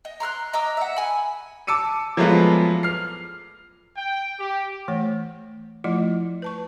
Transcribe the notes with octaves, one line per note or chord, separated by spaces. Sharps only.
D#5
A#5 C6 F6 F#6
D#5 A#5 D6 E6
E5 F#5
G#5 B5
A5 D6 E6 C#7 D#7
F3 F#3 G#3 A3 B3 F4
F6 C7
G5
G4
E3 A3 C#5
F3 A3 E4 F4 D#5
B4 A5 C#6